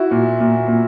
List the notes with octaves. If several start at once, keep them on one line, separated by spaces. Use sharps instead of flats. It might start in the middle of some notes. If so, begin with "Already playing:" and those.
Already playing: E4 F#4
A#2
A#2
A#2